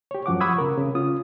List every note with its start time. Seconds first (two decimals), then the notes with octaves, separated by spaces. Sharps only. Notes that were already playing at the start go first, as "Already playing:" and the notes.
0.11 G4 C#5
0.26 F#2 F3 F#5 D6
0.41 F#5 B5 C#6 D#6 E6 G#6
0.58 C#3 A#4
0.77 C#3
0.95 C#4 F4 D#6